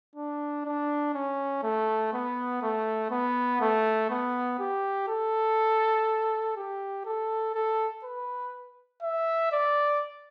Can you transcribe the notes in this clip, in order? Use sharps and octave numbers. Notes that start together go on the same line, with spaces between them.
D4
D4
C#4
A3
B3
A3
B3
A3
B3
G4
A4
G4
A4
A4
B4
E5
D5